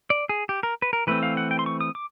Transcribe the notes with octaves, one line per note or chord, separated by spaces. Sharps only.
D5
G#4
G4
A#4
B4
A#4
E3 A3 C4 B4
F5
F#5
G5
C6
C#6
D#6
D6